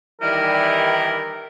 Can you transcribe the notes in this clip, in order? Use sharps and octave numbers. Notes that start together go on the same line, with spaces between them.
D#3 E3 G3 A#4